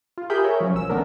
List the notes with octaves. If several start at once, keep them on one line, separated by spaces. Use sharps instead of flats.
F4
G4 G#4 A#4 E5 B5 G6
A#4 C#5 E5
F3 F#3 C#4
B1 E6
D#3 A3 B3 C#4 D4 A#4